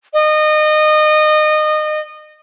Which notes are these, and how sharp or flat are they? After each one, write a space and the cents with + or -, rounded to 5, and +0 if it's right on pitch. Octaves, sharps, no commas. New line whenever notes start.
D#5 -25